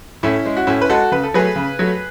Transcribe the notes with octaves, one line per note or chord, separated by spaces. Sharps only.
A2 C#4 E4
G#3
F#4
A2 C#4 E4
B4
G#3 F#4 A4
C#3 B4
A4
F#3 A3 G#4 B4
C#3
F#3 A3